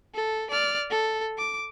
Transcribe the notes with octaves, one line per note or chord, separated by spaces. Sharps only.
A4
D5 F6
A4
D6